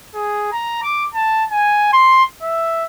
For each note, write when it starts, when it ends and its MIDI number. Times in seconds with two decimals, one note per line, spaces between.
0.14 0.48 68
0.52 0.79 82
0.83 1.05 86
1.14 1.45 81
1.51 1.90 80
1.93 2.23 84
2.42 2.85 76